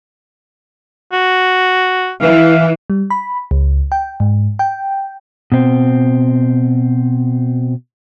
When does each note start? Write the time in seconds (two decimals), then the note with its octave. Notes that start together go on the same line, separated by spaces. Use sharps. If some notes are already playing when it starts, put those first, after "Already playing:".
1.13 F#4
2.21 E3 F5
2.90 G3
3.10 B5
3.51 C#2
3.92 G5
4.20 G#2
4.59 G5
5.52 B2 C4